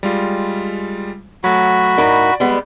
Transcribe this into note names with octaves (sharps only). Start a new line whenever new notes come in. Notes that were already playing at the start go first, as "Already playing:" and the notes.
G3 G#3 F4
F#3 A3 F#4 B5
A2 D#4 A#4 D5
G3 G#3 B3